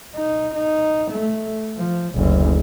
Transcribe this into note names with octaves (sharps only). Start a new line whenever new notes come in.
D#4
D#4
A3
F3
F#1 D2